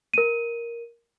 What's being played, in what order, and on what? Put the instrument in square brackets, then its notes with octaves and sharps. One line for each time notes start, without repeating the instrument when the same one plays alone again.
[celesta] A#4 D#7